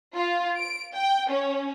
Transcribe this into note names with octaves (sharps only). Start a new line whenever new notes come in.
F4
D7
G5
C#4